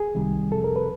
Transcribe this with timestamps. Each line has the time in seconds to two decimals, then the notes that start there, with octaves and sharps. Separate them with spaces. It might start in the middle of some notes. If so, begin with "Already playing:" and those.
Already playing: G#4
0.15 C2 C3 D#3 G3
0.52 F2 C3 F3 A4
0.64 A#4
0.76 B4